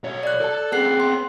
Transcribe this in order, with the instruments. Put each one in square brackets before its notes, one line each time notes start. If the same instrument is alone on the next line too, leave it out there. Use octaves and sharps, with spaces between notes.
[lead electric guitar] B1 C#5
[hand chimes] D5 F#6
[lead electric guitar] A4 A5
[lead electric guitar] B3 C4 [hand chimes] G#4 F#6 C7
[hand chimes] C6